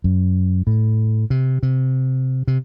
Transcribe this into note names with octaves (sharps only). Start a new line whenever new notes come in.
F#2
A2
C3
C3
C3